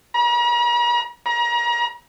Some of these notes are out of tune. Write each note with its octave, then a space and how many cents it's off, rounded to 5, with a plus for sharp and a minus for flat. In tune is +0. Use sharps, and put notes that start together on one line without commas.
A#5 +45
A#5 +30